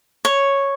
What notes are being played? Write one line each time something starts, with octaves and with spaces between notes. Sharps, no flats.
C#5